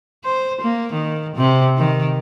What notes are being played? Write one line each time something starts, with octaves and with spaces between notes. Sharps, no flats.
C5
A#3
D#3
C3
D#3